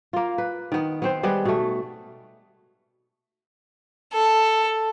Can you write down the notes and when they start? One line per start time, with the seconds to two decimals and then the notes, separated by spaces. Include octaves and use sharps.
0.13 A#3 F4
0.38 B4
0.72 D#3 B3
1.02 B3 C4 C5
1.23 G3 G#3 B3 B4
1.45 B2 A3
4.14 A4